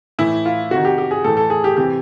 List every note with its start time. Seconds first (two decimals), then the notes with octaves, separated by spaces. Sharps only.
0.19 A2 E3 E4
0.45 F4
0.71 C3 D#3 F#4
0.85 G4
0.98 G4
1.11 G#4
1.24 A2 E3 A4
1.37 A4
1.50 G#4
1.64 G4
1.77 C3 E3 G4